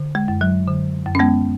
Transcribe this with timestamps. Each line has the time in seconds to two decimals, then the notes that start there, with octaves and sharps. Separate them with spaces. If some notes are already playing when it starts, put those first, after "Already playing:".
Already playing: D3
0.15 G#3
0.28 F#2
0.41 F#3
0.68 D3
1.06 F#2
1.15 C#4
1.19 G#3 B3